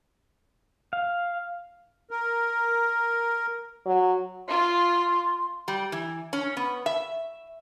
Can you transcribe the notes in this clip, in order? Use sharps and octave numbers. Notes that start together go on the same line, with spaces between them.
F5
A#4
F#3
F4 C6
G3
E3
C#4
B3
E5